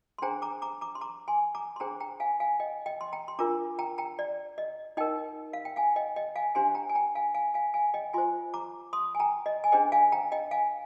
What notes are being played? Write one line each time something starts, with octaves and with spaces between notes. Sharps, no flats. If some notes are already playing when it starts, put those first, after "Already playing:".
C6
D4 G#4 C5 G5 A#5
A#5 D6
A#5 D6
A#5 D6
C6
A#5 D6
G#5 C6
A#5 D6
C6
D4 G#4 C5 G5 A#5
G5 A#5
F5 G#5
F5 G#5
D#5 G5
D#5 G5
C6
G5 A#5
C6
D4 F4 A#4 A#5 D6
G5 A#5
G5 A#5
D5
D#5
D#4 A#4 D#5 G5
F5
G5
F5 G#5
D#5 G5
D#5 G5
F5 G#5
D4 G4 C5 G#5 C6
G5 A#5
G#5
G5 A#5
F5 G#5
F5 G#5
F5 G#5
F5 G#5
D#5 G5
F4 C5 G#5 C6
A#5 D6
C6 D#6
G#5
G5 A#5
D#5
G#5
D4 G#4 C5 D#5 G5
F5 G#5
G5 A#5
D#5 G5
F5 G#5